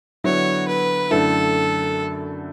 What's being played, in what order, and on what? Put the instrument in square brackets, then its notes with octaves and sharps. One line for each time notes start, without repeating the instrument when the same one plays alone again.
[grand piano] D3 F#3 B3 E4 [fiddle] C#5
[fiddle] B4
[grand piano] F#2 D3 A3 E4 [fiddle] A4